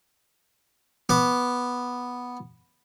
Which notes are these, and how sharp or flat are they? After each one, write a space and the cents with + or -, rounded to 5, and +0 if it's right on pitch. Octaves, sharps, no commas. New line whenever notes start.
B3 +0 D6 +0